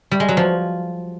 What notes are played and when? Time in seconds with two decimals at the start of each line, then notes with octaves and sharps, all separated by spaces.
0.11 G3
0.20 G#3
0.28 F#3
0.37 F3